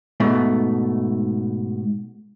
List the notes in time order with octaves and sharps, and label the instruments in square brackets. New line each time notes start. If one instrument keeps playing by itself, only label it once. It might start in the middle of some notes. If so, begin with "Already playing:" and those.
[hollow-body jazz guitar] G#2 B2 A3